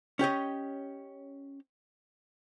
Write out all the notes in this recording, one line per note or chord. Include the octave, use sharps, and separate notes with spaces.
C#4 G4 C#5 D#5